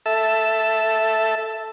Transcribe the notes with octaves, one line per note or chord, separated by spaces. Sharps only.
A4 E5